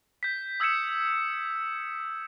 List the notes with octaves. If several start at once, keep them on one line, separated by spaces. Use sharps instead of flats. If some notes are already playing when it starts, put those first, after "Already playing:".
G6 B6
D#6 E6 G#6 B6 C#7 E7